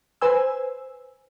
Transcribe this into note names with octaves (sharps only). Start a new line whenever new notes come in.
B4 C5 G#5 E6